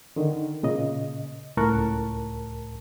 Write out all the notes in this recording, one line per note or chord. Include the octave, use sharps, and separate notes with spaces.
D3 D#3
A#2 C#3 D#5
C#2 A2 A#4 A5 C#6 F#6